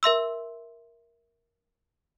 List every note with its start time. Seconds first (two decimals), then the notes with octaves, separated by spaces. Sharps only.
0.03 A#4 E5 C6 E6